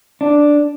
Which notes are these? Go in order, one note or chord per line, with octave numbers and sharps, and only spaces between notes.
D4